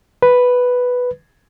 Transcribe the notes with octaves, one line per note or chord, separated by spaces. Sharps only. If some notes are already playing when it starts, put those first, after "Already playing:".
B4